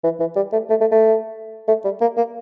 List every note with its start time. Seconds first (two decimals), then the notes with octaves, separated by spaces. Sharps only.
0.04 E3
0.20 E3
0.36 G3
0.53 A3
0.70 A3
0.81 A3
0.92 A3
1.68 A3
1.85 G3
2.01 A#3
2.17 A#3